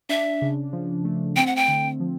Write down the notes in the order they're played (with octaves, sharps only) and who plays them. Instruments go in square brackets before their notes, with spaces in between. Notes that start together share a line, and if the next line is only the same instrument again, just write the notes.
[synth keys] D4 [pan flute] E5
[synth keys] C#3
F3
A3
[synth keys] C4 [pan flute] G5
[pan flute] F#5
G5
[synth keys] D3
F3